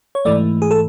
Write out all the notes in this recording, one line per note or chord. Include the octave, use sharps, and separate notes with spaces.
C#5
G#2 E3 A3 D5
G#4
A4